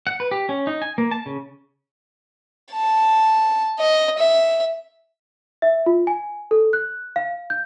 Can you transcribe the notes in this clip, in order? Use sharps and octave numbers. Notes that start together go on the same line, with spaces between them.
F#5
B4
G4
C#4
D#4
G#5
A#3
A5
C#3
A5
D#5
E5
E5
F4
G#5
A4
F#6
F5
G6